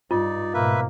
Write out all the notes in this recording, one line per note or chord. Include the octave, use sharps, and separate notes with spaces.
G2 D#4 F4 D5
G#2 B2 A#3 B4 E5